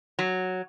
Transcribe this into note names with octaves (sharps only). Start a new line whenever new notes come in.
F#3